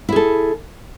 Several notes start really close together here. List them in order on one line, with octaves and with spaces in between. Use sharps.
E4 G#4 A4